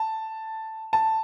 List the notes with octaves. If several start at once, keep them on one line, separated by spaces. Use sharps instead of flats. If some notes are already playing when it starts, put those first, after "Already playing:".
Already playing: A5
A5